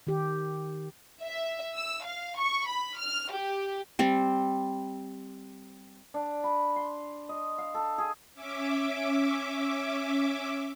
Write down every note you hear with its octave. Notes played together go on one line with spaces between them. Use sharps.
D#3 G4
E5
E6
F5
C#6
B5
F6
G4
G3 C4
D4
B5
C6
D#5
F5
A4
G#4
C#4 E5 D6